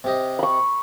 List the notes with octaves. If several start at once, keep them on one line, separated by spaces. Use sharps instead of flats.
C3 G4 D#5
B5 C#6